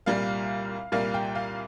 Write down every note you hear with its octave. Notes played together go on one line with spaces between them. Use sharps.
C2 A#2 G3 A#3 F5
C2 A#2 G3 A#3 F5
G5
F5